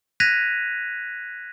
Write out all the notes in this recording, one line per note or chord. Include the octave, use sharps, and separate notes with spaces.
F#6 G#6 A#6 B6 D#7 F7